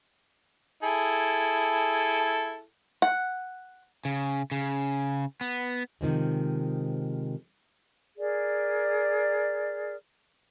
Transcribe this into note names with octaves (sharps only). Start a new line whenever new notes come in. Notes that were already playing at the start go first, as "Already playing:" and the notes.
E4 G#4 A4
F#5
C#3
C#3
B3
C3 D#3 F3 G#3
G#4 A#4 D5